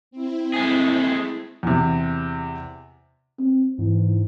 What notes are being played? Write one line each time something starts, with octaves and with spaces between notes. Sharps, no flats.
C4 E4
G#3 A3 G#4
E2 C3
C4
G#2 E3